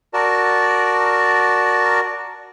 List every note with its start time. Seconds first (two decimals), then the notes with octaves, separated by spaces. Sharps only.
0.14 F#4 A#4 D5 A5